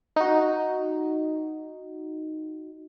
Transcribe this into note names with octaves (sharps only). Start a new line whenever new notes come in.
D#4 F#4